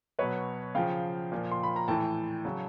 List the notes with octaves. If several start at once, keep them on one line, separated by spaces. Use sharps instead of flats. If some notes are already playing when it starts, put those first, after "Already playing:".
B2 F#3 B4 C#5
C#3 F3 F5 G5
A#2 F3
C6
B5
A#5
A2 E3 G5 A5
C#3 F#3